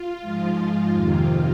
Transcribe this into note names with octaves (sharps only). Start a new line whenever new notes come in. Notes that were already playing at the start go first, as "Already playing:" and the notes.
Already playing: F4
G#2 F3 G#3
F2 C3 D#3 A#3 F4